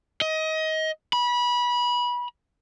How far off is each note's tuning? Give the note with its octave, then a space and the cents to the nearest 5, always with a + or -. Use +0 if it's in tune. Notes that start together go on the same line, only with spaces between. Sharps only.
D#5 +25
B5 -25